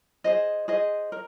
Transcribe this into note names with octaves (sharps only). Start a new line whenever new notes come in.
G#4 C5 D#5
G#4 C5 D#5
A#4